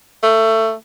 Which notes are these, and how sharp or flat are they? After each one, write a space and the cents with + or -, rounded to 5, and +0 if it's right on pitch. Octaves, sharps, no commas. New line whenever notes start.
A3 +20